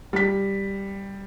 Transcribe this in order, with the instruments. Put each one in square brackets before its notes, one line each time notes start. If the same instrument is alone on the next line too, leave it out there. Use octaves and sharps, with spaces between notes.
[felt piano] G3 B6